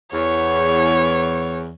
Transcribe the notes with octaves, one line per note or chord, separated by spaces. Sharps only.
E2 C#5